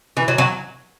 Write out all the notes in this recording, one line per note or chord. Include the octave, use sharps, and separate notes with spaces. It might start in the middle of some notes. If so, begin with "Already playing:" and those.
E3
F#3
F#3